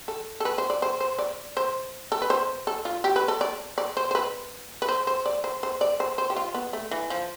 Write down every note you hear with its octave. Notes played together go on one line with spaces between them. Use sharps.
A4
A4
B4
C5
D5
C5
C5
D5
C5
A4
B4
C5
A4
F4
G4
B4
A4
D5
D5
C5
C5
B4
B4
C5
C5
D5
C5
C5
D5
C5
C5
G4
F4
B3
A3
E3
F3